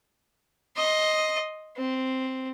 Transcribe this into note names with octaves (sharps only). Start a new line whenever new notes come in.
D#5 C6
C4